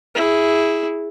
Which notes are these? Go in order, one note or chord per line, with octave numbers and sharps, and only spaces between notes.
E4 G#4